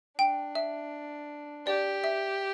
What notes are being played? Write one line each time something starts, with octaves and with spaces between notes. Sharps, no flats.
D4 G5
E5
G4 D5
E5